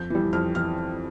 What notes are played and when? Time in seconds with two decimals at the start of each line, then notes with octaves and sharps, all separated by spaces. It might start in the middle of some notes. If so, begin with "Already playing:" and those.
Already playing: F2 G6
0.10 E3 G3
0.33 F2 F6
0.55 E3 F6